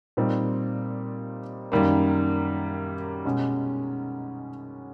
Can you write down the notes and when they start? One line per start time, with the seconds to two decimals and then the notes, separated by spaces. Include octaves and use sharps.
0.17 A#2 G3 C4 D#4
1.72 F#2 D#3 G3 A#3
3.25 B2 G#3 C#4